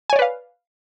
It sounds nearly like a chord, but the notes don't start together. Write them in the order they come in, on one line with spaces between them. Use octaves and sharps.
G#5 C#5 D5 B4 F5